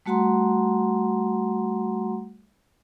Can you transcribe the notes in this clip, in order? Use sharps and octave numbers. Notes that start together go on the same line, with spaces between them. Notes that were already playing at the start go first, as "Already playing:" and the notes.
G3 A3 F#4 F#5 A#5 C6